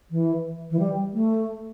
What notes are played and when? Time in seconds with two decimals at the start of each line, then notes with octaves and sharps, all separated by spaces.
0.11 E3
0.71 E3
0.79 G3
1.14 A3